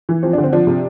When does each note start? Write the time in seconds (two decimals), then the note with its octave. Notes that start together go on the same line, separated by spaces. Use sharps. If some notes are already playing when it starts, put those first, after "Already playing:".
0.09 E3
0.23 F3 C4
0.33 D4
0.38 D3
0.43 C4
0.53 F3 D4
0.67 C3